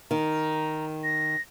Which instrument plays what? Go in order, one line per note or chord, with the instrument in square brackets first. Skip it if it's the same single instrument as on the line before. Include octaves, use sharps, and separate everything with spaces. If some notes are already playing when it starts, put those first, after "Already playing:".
[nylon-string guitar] D#3 [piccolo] A#5
[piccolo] A#6